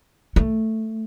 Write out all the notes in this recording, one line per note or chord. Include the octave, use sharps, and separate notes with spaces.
A3